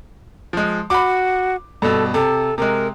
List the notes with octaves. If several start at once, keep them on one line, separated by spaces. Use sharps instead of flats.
F3 G#3
F#4 B5 D6
G2 B2 A4
C3 A4
C3 G#3 A#4